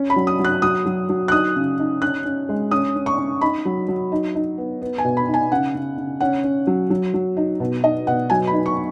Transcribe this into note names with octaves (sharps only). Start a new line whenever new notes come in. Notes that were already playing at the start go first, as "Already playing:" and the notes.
Already playing: C#4
B5
F#3
D#6
F#3
F#6
F#3 D#6
F#3
F#3
F#6
D#4 D#6
C#3
D#4
C#4 F#6
C#4
G#3
C#4 D#6
C#4
C#6
C#4
D#4 B5
F#3
F#3
D#4
D#4
B3
B3
G#5
B2
B5
D#4
G#5
C#3 F#5
C#3
C#3
C#4 F#5
C#4
F#3
F#3
F#3
D#4
B2
D#4 D#5
B2 F#5
F#3 G#5
B5
D#4
C#6